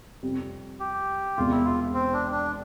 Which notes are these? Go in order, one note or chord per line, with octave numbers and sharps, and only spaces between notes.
F2 C3 G3
G4
E1 E2 C3 F4
E4
F4
C4
D4
D4